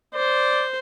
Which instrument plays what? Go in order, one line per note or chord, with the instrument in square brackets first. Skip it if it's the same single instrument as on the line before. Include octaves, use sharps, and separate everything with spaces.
[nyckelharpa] C5 [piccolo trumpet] D5